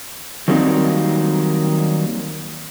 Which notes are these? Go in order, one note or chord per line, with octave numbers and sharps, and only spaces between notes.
D#3 F#3 G3 A#3 C4 D#4